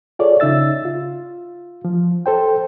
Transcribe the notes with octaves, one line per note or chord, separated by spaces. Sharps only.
F4 G#4 A4 C#5 D5
C#3 D#4 E5 E6 A6
F4
F3
A4 C5 G5